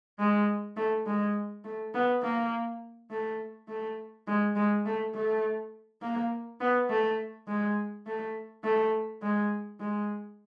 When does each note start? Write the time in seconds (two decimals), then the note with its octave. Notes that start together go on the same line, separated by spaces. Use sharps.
0.19 G#3
0.77 A3
1.06 G#3
1.64 A3
1.94 B3
2.23 A#3
3.10 A3
3.68 A3
4.27 G#3
4.56 G#3
4.86 A3
5.15 A3
6.02 A#3
6.60 B3
6.90 A3
7.47 G#3
8.06 A3
8.64 A3
9.22 G#3
9.80 G#3